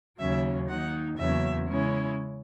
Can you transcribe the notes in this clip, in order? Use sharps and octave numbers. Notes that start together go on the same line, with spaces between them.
D#2 C#3 F#3 A#3 C#4 E5
D#3 A#3 D#4 F#5
E2 C#3 F#3 A#3 C#4 E5
C#3 G#3 C#4 E4